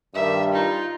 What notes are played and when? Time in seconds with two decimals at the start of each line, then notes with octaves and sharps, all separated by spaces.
0.15 G2 D#3 G3 E5
0.55 D#4 F4